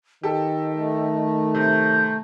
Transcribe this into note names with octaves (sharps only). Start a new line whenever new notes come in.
D#3 G4 A4 D#5
A3
C3 G6